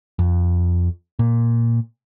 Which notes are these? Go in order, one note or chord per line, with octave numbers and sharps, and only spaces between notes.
F2
A#2